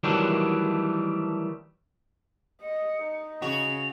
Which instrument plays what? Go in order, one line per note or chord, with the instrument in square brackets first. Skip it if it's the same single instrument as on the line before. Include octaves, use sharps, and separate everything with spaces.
[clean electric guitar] D#3 E3 F#3 G3 A3 D4
[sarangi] D#5 [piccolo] C#7
[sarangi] D#4
[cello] C#3 [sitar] F#4 [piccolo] F7